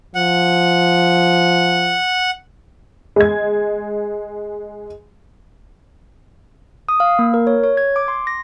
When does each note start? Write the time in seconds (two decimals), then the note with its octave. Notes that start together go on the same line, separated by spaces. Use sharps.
0.15 F3 F#5
3.16 G#3 G#6
6.89 D#6
7.00 F5
7.19 A#3
7.34 A#4
7.47 C#5
7.64 C#5
7.77 G#6
7.96 D6
8.08 C6
8.27 A#6